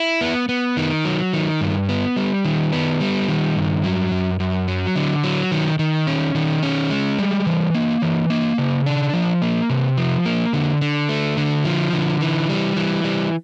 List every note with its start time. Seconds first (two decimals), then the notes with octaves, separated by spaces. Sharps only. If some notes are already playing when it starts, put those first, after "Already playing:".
Already playing: E4
0.21 B3
0.49 B3
0.77 D#3
1.05 F#3
1.33 D#3
1.61 G2
1.89 B3
2.17 G3
2.45 D#3
2.73 B3
3.01 G3
3.28 D#3
3.56 G2
3.84 F#3
4.12 F#2
4.40 F#2
4.68 F#3
4.96 D3
5.24 F#3
5.51 D#3
5.79 D#3
6.07 C#4
6.35 D#3
6.63 C#4
6.90 G#3
7.19 G3
7.46 E3
7.74 A#3
8.02 E3
8.30 A#3
8.58 C#3
8.86 D4
9.13 F3
9.42 A#3
9.70 C3
9.98 F3
10.26 A#3
10.53 D3
10.81 D3
11.09 A3
11.37 D3
11.65 F3
11.93 D3
12.21 E3
12.49 G3
12.76 E3
13.04 G3